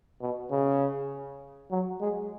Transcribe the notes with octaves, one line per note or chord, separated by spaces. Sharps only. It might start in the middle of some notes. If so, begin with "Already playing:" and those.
B2
C#3
F#3
G#3